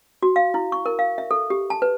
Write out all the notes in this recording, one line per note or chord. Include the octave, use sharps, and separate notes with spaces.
F#4
F5
E4
C#6
A#4
F5
E5
A4
G4
A5
B4